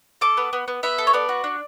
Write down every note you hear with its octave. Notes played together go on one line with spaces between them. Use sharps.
A4 D6
B3
B3
B3
B3 E5
A4
C#5
B3 D5
F#4
D4